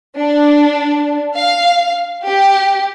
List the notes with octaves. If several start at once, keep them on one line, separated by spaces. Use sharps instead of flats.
D4
F5
G4